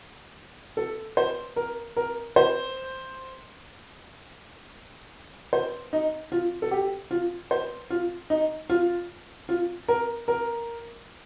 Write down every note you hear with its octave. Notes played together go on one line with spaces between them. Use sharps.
A4
C5
A#4
A#4
C5
C5
D#4
F4
A4
G4
F4
C5
F4
D#4
F4
F4
A#4
A#4